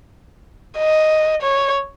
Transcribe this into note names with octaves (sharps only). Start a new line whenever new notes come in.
D#5
C#5